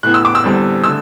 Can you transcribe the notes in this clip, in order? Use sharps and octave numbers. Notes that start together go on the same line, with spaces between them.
A2 E3 B3 F#6
E6
D6
E6
E2 D3 G3 C4
D3 A3 E6